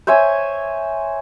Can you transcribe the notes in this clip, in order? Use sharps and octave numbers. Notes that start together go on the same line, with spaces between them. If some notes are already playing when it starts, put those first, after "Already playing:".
C5 C#5 E5 G#5